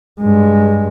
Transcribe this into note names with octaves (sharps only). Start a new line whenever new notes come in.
G2 G#3